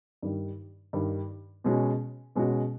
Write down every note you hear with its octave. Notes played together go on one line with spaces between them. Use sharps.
G2 D#3 G3
G2 D#3 G3
B2 G#3 C#4 F#4
B2 G#3 C#4 F#4